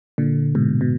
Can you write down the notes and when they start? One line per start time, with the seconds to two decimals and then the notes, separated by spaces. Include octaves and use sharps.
0.18 A#2 D3
0.55 G#2 B2
0.81 B2